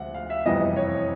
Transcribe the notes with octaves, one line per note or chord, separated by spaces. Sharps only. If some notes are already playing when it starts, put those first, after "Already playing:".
Already playing: D2 C3 F3 G#3 F#5
F5
E5
F#1 F2 C3 E3 G3 D#5
C#5